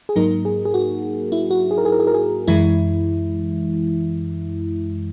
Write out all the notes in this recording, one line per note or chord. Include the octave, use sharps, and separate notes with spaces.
G#4
G#2 F#3 A#3 D#4 A#4
G#4
G#4
F#4
E4
F#4
G#4
A#4
G#4
A#4
G#4
A#4
G#4
F#2 E3 G#3 E4